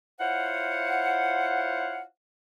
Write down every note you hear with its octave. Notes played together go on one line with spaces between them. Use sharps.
E4 F4 C5 C#5 F5 F#5